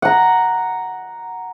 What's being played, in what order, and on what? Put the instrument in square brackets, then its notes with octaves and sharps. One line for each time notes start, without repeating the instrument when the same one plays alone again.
[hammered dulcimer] F#5 A#5